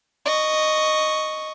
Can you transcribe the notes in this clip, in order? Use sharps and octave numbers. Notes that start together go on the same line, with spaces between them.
D#5 C#6